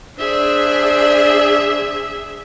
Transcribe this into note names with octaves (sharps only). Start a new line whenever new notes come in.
D4 G#4 C5 D5 E5